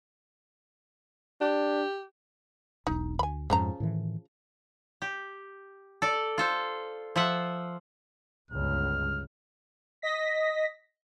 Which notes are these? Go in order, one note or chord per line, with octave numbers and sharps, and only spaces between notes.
D4 G4
E1 B1 D#4
D2 G#5 B5
F2 G#2 C#3 F3 A#5
A2 D#3 E3
G4
A4 D5
F4 A4 C5
F3 F4 E5 F#5
G1 C#2 F6
D#5 A#6 B6